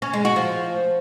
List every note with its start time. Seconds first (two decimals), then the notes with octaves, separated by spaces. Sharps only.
0.02 C#4
0.13 G#3
0.25 F#4
0.36 F3